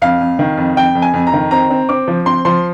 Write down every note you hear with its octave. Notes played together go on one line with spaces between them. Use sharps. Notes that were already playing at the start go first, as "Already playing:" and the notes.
F2 F5
F2
D#3
F2
F2 G5
F2
G#5
F2
A#5
D#3
C4 A#5
C4
C4 D6
F3
C4 C6
F3 C6